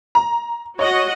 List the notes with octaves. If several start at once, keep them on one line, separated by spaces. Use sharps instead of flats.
A#5
F#4 C#5 D#5 F#5 C#6